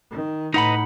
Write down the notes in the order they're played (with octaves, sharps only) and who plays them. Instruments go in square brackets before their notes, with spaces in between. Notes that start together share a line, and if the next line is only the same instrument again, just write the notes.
[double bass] D#3
[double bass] A2 [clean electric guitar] D#4 F#5 B5 [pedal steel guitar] B4 D#5 A#5